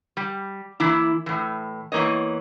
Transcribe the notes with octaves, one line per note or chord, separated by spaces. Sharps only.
G3
E3 A#3 E4
A2 E3
E2 E3 A#3 C#5 D#5